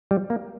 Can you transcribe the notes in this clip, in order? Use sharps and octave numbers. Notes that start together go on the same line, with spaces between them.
G3
A#3